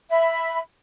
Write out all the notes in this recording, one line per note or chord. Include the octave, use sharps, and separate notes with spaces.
E5 B5